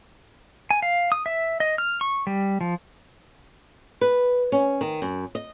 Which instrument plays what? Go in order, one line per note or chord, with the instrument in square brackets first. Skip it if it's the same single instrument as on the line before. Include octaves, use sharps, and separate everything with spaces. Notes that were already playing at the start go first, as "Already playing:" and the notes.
[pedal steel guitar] G#5
F5
D#6
E5
D#5
F6
C#6
G3
F3
[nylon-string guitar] B4
C#4
D#3
F#2
D#5